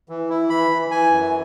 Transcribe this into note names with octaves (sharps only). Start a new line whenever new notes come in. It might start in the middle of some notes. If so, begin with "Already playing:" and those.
E3
E4
E3 B5
E3
E3 G#5
F#2